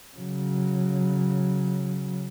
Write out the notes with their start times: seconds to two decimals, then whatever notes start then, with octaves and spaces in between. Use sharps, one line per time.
0.17 C#3 F#3